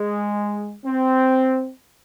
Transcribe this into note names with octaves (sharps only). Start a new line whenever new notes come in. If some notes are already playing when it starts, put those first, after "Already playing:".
Already playing: G#3
C4